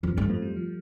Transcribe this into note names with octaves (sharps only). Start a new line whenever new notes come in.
F2 F3
G2 A3
F2 A3
G3
F3